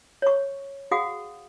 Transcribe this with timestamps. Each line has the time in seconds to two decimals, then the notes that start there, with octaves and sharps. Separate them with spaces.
0.22 C#5 C#6
0.91 F#4 G#4 F5 F#5 D#6